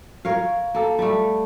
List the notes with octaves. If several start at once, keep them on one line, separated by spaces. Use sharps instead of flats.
A#4 C#5 F5
A#3 A4
G3 A3